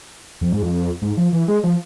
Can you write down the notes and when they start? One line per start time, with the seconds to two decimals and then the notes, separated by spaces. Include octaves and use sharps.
0.41 F2
0.52 G#2
0.63 F2
1.02 G#2
1.17 F3
1.33 E3
1.48 G#3
1.64 F3